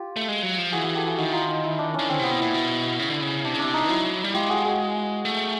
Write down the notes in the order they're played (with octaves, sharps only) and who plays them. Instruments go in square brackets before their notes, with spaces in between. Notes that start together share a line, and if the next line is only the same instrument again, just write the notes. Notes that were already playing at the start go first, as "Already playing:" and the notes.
Already playing: [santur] F4 G4
[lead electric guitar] A3
G#3
F#3
F3
[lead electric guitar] E3 [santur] F#4 G#4
[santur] F#4 G#4
G4 A4
F#4 G#4
[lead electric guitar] D#3 [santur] E4 F#4
[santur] D#4 F4
D#4
E4
D4
[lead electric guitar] D#3 [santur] C#4
[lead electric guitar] D3 [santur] C4
[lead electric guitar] C3 [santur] B3
[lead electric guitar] B2
[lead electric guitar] A#2 [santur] E4
[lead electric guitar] B2
C#3
D3
C#3
[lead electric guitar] C3 [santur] D4
[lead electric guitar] C#3
[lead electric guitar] C3 [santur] D4
[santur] D#4
[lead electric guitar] F#3 [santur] E4
[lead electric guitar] G3
[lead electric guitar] G#3 [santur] F4 G4
[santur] F#4 G#4
F#4 G#4
[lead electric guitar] A3